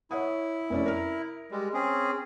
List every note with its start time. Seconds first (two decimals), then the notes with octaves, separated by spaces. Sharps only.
0.11 E4 C#5 F#5 D#6
0.70 F1 C#4 D5
0.86 A#4 F6
1.51 G3 G#3
1.74 C4 C#4 G#4